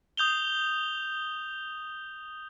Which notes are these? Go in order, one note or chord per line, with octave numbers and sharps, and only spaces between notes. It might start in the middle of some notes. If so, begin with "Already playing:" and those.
D#6 G6 F7 G7